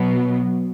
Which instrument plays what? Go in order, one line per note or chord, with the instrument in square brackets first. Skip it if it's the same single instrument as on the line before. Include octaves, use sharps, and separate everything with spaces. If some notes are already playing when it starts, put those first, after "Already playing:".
Already playing: [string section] B2 F#3 B3